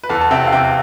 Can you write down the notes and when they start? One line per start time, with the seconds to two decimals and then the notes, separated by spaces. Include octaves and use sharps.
0.03 B4
0.09 E2 A4
0.21 A5
0.31 C3 E5 G5
0.47 F5
0.52 E2 E5 G5